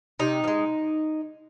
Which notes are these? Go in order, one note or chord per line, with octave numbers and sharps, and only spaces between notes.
C3 D#4
F3
G#3